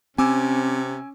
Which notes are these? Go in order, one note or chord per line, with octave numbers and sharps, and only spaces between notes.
C3 C4 C#4 G#5 D6 E6